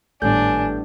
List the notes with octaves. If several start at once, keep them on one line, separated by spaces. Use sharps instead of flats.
G#1 A2 G3 B3 D4 A4 G#5 G6